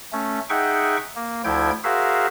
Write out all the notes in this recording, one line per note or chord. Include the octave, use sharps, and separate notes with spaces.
A3 C#4
D#4 G#4 E5 F#5 G5 C#6
A#3
D2 F3 E4 G5 G#6
F#4 G#4 A#4 C5 E5 F5